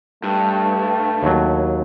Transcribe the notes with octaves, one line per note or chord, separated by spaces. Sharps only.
G2 A3
D#2 F#3